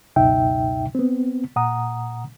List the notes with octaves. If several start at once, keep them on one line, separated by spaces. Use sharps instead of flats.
C#2 F#2 B2 D#4 E5 G5
B3 C4
A#2 F#5 A#5 D#6